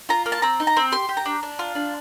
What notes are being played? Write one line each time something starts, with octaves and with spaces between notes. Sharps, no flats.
F4 A#5
A#3
A5
C4 A#5
D#4
A#5
C4
G4 C6
G4
A#5
D4
D4
F4
D4